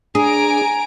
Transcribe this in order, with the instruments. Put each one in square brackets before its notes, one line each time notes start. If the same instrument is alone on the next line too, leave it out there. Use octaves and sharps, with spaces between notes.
[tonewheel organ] D4 [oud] G#4 [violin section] G#5 A#5 D7